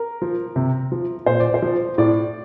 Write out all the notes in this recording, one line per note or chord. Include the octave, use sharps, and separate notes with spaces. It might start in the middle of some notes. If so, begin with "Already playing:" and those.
Already playing: A#4
F3
C3
F3
A#2 C5
D5
C5
F3
A2 D5